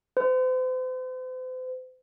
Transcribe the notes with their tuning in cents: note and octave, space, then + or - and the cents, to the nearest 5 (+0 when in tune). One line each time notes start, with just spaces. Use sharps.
C5 -40